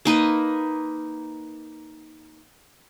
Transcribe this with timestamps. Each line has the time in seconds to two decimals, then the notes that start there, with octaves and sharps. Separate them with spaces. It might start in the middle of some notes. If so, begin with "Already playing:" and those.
0.05 A#3 D#4 B4 D#5